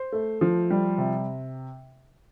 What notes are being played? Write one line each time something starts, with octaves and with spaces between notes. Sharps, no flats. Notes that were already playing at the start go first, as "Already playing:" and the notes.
Already playing: C5
A3
F3
G3
C3